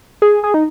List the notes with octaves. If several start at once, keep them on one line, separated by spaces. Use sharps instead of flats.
G#4
G#4
D#4